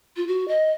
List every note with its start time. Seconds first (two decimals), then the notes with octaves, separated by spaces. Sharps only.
0.16 F4
0.27 F#4
0.48 D#5